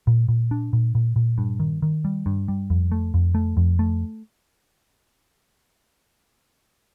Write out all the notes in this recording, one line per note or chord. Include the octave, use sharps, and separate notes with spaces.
A#2
A#2
D4
A#2
A#2
A#2
G2
D#3
D#3
G3
G2
G3
F2
A3
F2
A3
F2
A3